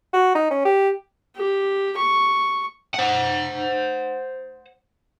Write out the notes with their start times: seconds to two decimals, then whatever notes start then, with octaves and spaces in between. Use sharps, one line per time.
0.13 F#4
0.35 D#4
0.51 C#4
0.65 G4
1.36 G4
1.97 C#6
2.95 C5 F#5